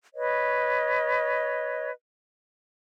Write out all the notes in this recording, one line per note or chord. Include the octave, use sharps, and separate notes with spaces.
B4 C#5 D#5